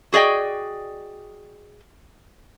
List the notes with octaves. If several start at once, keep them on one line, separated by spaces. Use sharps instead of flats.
F#4 G#4 D5 D#5 G5